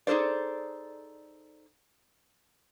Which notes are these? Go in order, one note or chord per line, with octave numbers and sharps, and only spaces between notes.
D#4 G#4 A4 C5 D5